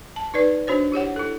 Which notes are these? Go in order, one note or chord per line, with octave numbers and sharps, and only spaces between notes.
A5
D#4 B4 D5
D4 F#4 C5 C#5
E4 G4 C#5 F#5
E4 A4